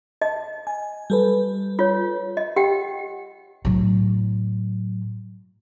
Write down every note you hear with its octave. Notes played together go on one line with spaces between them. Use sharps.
D#5 A5
G#5
G3 A4 B4
F4 C#5
D#5
G4 F#5 G5
A2 F#3